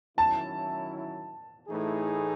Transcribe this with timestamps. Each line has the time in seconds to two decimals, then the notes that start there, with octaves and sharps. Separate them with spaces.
0.18 D#3 F#3 C#4 E4 A5
1.68 A2 E3 A3 D#4 G#4